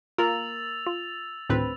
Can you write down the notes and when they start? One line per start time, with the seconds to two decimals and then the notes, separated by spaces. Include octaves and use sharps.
0.18 A#3 F4 A#4 E6 A6 F7
0.87 F4
1.50 D2 A2 D#3 C4 B4